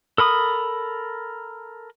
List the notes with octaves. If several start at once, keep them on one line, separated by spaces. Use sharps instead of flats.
A4 A#4 B5 D#6